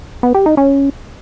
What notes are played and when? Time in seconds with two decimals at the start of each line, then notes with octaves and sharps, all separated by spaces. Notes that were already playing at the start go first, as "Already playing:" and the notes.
0.23 B3
0.34 G4
0.46 D#4
0.57 C#4